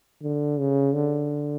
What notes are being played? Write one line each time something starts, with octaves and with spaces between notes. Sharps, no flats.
D3
C#3
D3